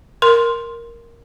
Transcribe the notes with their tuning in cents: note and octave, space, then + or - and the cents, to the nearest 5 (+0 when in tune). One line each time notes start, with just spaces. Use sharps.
A#4 +0 C6 +0